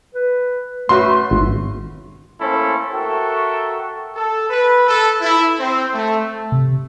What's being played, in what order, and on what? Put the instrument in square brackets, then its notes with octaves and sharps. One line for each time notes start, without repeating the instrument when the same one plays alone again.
[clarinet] B4
[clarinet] A3 [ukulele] C#4 F#4 B4 [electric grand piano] C6
[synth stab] G#1
[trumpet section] A3 A#3 C#4 E4 A4 C5
F#4 A4 A#4 E5 G5 C#6
A4
B4
A4
E4
C4
A3
[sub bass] C3